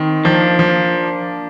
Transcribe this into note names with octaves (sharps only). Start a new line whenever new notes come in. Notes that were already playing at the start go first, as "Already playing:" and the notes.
Already playing: D#3 C4
F3 A#3 D4
F3